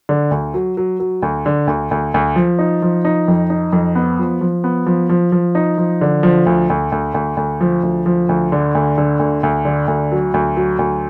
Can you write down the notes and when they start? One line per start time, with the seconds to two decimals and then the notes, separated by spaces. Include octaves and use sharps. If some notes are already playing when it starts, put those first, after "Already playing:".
0.09 D3
0.31 D2
0.54 F#3
0.77 F#3
1.00 F#3
1.22 D2
1.46 D3
1.67 D2
1.91 D2
2.14 D2
2.36 F3
2.59 D#4
2.82 F3
3.05 D#4
3.28 F2
3.50 D#4
3.73 F2
3.95 B3
4.19 F3
4.41 F3
4.64 B3
4.86 F3
5.09 F3
5.32 F3
5.55 D#4
5.78 F3
6.01 D3
6.23 F3
6.46 D2
6.70 D2
6.92 D2
7.14 D2
7.37 D2
7.61 F3
7.83 D2
8.06 F3
8.29 D2
8.52 D3
8.75 D2
8.98 D3
9.19 D2
9.43 D2
9.65 D3
9.88 D2
10.12 F#3
10.34 D2
10.57 F#3
10.79 D2